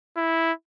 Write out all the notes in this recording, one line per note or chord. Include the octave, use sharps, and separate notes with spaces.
E4